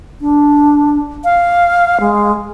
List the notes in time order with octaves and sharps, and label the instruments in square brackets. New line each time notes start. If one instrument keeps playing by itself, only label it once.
[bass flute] D4
F5
G#3